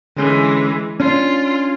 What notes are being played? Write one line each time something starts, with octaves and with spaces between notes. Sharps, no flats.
D3 E3 G#3 C#4
C#4 D4 F4